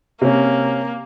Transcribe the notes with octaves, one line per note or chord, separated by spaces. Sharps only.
C3 A#3 C#4